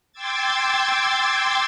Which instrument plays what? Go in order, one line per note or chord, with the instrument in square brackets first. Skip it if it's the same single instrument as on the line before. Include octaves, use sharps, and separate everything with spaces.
[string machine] G5 C6 D6 E6 G#6 A6